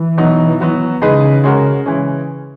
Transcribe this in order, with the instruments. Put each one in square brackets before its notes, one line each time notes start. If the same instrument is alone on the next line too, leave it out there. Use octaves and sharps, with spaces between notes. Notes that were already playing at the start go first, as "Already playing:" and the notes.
Already playing: [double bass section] E3
[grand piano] B2 F#3 B3 D#4
F#3 B3 F#4
[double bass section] C#3 [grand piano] G#3 D#4 G#4 B4 D#5
[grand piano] G#3 C#4 F#4 A#4
E3 G#3 C#4